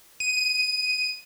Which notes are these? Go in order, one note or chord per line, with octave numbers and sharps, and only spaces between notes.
D#7